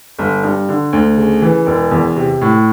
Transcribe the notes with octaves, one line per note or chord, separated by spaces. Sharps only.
G1
G2
D3
D2
C#3
E3
E1
E2
C3
A2